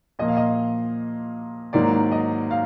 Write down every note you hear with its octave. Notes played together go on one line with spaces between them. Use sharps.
A#2 F3 A#3 D#5
F5
D#5
G#2 D#3 F#3 A#3 D5
D#5
F5